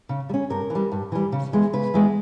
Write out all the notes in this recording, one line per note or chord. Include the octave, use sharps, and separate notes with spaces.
C#3
G3
C#4
G2 A#4
E3
G3
G2
E3 G3
C#3
E3 G#3 B3
C#3 B4
E3 G#3 B3